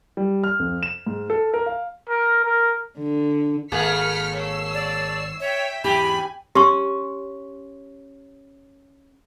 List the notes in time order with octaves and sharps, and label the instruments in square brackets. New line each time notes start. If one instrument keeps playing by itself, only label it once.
[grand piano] G3
F6
F2
E7
G#2
A4
A#4
F5
[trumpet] A#4
A#4
[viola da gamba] D3
[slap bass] G#1 [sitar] A3 A#3 G#4 [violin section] F6 B6 C#7
[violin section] C#5 E6 C7
[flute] D5
[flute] C#5 [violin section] E5 G5 B6
[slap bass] E2 G#2 [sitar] G4 [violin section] G#5 [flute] B5
[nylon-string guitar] C#4 [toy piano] G4 C6 C#6